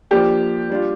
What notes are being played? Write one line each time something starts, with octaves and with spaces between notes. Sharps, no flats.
F3 A#3 D4 G4
G3 D4 F4